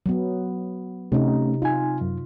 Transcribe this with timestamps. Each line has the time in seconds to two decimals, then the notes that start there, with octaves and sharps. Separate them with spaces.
0.06 F#3 B3
1.12 C3 A3 C#4 D#4
1.62 D#4 F4 G#5
2.01 F#2